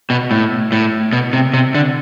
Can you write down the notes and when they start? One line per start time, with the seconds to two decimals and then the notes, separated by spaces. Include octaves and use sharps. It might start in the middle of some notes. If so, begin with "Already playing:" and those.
0.10 B2
0.31 A2
0.72 A2
1.13 B2
1.33 C3
1.54 C3
1.75 D3